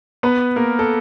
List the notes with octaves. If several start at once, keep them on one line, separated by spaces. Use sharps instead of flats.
B3 B4
A#3 A#4
A4